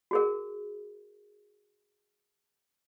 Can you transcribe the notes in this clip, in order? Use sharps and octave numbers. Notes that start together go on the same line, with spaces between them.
F#4 G#4 A#4